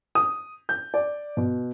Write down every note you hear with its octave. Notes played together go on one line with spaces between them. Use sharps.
D#6
G6
D5
B2